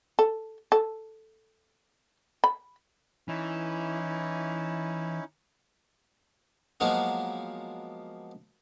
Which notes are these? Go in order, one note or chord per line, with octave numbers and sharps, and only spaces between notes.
A4
A4
B5
E3 C#4 D#4 E4
F3 F#3 G#3 A#3 B3 F#4